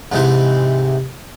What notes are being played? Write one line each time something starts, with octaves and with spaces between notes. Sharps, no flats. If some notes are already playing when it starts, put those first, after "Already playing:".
G#2 C3 E3 D#4